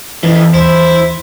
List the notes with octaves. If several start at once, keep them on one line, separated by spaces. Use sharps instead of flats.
F2 E3
D#2 E4 C5